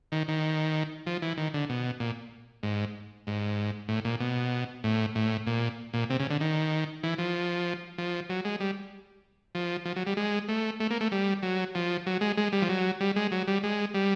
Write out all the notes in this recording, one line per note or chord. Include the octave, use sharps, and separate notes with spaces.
D#3
D#3
F3
E3
D#3
D3
B2
A#2
G#2
G#2
A2
A#2
B2
A2
A2
A#2
A#2
C3
C#3
D3
D#3
E3
F3
F3
F#3
G#3
G3
F3
F3
F#3
G3
G#3
A3
A3
A#3
A3
G3
F#3
F3
F#3
G#3
G#3
G3
F3
F#3
G3
G#3
F#3
G3
G#3
G3